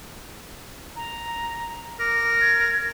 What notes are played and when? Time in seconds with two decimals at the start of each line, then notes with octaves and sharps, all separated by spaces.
0.96 A#5
2.00 A#4 D6
2.41 G#6